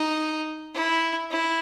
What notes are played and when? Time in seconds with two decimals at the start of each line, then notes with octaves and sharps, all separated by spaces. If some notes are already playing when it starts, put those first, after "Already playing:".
Already playing: D#4
0.74 E4
1.31 E4